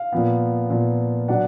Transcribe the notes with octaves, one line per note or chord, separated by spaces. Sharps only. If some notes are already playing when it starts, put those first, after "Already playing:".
Already playing: F5
A#2 F3 B3
A#2 F3 B3
B2 F#3 D4 F#5